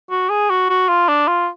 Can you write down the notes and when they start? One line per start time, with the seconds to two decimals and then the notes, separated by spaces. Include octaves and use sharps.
0.10 F#4
0.30 G#4
0.50 F#4
0.70 F#4
0.89 F4
1.08 D4
1.28 F4